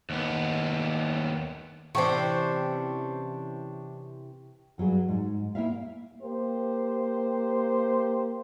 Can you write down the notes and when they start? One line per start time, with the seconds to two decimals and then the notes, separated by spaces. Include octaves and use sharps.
0.10 D#2 B3
1.95 C3 E3 C#4 D4 C5 G5 C#6
4.78 G2 F#3 F#4 G#4
5.08 G#2
5.55 A#3 C4 E4 E5 F5
6.22 A#3 G4 C5